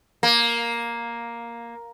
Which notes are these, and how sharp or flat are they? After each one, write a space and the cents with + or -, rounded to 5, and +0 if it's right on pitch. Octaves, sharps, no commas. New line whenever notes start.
A#3 +5